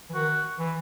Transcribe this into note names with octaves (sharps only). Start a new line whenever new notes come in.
E3
D#3 F#4
E3